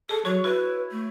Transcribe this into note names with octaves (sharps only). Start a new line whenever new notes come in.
G#4 A4 A5
F#3 F#4 C#5
E4 F#4 B4
A3